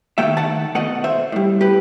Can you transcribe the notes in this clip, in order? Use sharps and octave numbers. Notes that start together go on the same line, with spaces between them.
D#3 F#3 A3 E5 G5
F#5 A5
B2 A3 D#5 F#5
C5 E5
A2 G3
G4 B4